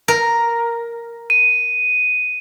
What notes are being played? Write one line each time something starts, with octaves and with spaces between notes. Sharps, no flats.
A#4
D#7